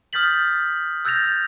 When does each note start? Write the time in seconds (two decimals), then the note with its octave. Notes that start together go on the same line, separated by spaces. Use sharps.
0.13 D#6 F6 G6 A6 B6 F#7
1.05 E6 F#6 G6 A6 A#6 F7